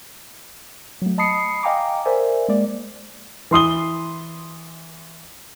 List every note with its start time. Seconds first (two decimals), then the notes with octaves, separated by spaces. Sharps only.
1.02 F#3 A3
1.18 D#5 A5 B5 D#6 C7 C#7
1.63 D#5 F5 G5 G#5 A#5 D6
2.05 A#4 C5 D5 E5 G#5
2.48 G#3 A#3 D5
3.51 E3 C6 D#6 G7